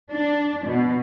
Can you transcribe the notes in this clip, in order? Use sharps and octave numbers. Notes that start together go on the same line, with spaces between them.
D4
B2